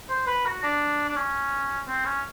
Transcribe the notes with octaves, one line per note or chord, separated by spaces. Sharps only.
C5
B4
F#4
D4
D4
C#4
C4
C#4